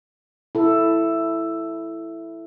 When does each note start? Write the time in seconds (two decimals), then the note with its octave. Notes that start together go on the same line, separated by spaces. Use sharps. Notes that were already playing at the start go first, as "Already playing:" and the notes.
0.55 E4 A4